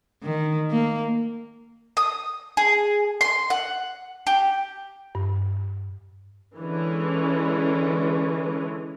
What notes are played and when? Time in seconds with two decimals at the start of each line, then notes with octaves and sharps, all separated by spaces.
0.23 D#3
0.71 A#3
1.97 D#6
2.57 G#4
3.21 C6
3.50 F#5
4.27 G4
5.15 G2
6.57 D3 E3 G#3 C#4